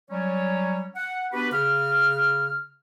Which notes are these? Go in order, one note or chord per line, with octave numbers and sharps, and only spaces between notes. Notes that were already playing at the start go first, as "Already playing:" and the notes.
F#3 G3 C#4 C#5
F#5
B3 D4 F#4 G4 B4
C#3 F6